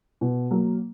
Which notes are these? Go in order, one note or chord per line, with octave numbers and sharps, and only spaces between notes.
B2
F#3 A#3